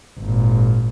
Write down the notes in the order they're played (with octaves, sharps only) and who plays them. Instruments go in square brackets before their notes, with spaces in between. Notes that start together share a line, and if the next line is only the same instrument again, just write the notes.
[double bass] G#1 A#2